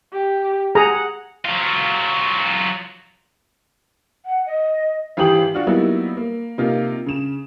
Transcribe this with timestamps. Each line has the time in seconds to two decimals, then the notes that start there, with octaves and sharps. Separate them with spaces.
0.13 G4
0.75 G#4 F#5 A#5
1.45 F#3 F4
4.26 F#5
4.46 D#5
5.17 G#1 E3 G4 G5 D#6 F#7
5.54 D4 F4 F#4
5.67 F#3 G3 A#3 B3 D#4 E4
6.17 A#3
6.58 C3 A#3 D#4 F4
7.06 C#3 E7